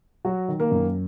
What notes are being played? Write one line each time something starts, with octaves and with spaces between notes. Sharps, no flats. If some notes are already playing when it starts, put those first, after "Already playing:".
F#3 F#4
D#3
A#3 A#4
F#2